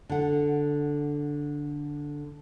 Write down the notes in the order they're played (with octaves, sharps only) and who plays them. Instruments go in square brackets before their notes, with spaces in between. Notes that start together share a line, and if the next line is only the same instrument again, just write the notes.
[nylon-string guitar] D3 F#5